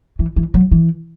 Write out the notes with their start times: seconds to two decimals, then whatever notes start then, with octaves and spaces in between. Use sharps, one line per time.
0.19 E3
0.36 E3
0.54 F#3
0.71 E3